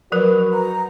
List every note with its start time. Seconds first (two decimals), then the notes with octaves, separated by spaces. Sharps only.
0.12 F3 F#3 F#4 A#4 B4
0.53 A#5